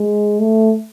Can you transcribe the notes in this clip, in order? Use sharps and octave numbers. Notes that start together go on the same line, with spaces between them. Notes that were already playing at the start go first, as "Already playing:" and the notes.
Already playing: G#3
A3